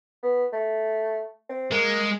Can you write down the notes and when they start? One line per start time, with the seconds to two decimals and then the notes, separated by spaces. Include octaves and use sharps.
0.23 B3
0.53 A3
1.49 C4
1.71 G#3 A#3